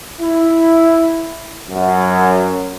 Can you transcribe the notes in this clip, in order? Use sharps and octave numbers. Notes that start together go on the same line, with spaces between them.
E4
F#2